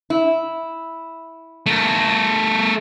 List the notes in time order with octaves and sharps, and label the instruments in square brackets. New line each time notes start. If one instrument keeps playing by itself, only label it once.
[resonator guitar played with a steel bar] E4
[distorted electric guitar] A3 A#4